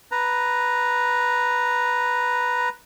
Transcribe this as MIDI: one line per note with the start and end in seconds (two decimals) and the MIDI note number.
0.12 2.69 71
0.12 2.69 82